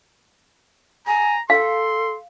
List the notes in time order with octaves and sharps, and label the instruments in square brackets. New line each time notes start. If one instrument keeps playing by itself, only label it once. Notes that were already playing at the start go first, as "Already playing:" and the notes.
[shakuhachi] G#5 [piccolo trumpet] A#5
[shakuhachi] A4 [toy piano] F5 [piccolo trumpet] C6